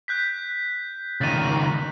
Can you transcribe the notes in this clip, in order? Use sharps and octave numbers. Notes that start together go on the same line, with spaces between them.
F#6 G6 B6
C#2 D#3 A6 D#7